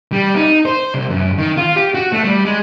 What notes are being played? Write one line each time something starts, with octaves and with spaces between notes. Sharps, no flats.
G3
D#4
C5
C2
F#2
D#3
F4
G4
F#4
A3
G3
G#3